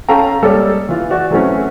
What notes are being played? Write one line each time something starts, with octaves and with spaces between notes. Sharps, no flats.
C#4 A4 F5 G5 A5 A#5
G3 G#3 A#3 A4 C#5 D5
E3 F4
F#4 D5
E3 F#3 A3 C4 C#4